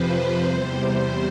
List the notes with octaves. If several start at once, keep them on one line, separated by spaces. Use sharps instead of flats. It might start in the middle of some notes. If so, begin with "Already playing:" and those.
Already playing: F2 C3 F3 B4 C5
E2 C3 G3